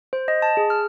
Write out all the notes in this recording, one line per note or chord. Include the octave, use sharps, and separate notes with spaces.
C5
D#5
A5
G#4
F6